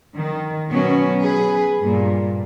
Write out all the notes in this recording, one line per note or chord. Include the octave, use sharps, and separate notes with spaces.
D#3
B2 F#3 B3 C#4
G#4 B4
G2 A#2